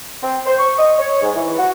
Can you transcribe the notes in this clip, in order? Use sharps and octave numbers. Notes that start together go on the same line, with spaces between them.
C4
C5
C#6
D#5
C#5
G#2
E3
F#4